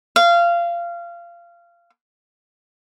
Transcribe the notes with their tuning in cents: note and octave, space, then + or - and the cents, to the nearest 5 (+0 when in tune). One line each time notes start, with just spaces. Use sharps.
F5 -20